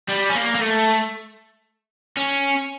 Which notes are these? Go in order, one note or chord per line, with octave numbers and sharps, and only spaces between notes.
G3
C#4
A#3
A#3
A3
C#4